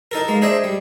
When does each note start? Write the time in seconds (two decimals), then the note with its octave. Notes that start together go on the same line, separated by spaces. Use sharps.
0.11 D#4 A4 A#4
0.28 G#3 A#3
0.42 D4 G#4 C5 D#5 E5
0.64 G3